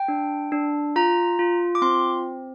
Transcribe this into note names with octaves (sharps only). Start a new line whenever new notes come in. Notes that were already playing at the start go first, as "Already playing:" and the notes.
Already playing: G5
D4
D4
F4 A#5
F4
D6
C4 C6